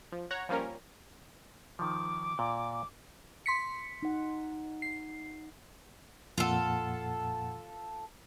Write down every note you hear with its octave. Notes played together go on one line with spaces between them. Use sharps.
F3
C#5 F#5 A#5
F3 G3 A#3 C#4 A#4
D#3 F3 D6
A#2 G5
C6 B6 C#7
D#4 F#5
C7
F2 A#2 F4 A4 F#5